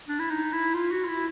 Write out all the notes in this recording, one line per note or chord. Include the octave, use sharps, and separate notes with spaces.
D4
E4
D#4
E4
F4
F#4
F4
E4